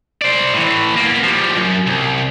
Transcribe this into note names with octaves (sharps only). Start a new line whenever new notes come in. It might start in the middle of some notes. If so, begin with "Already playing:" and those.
C5 D5
A2 E3
A#3 B3
F3 G3
F#2
C2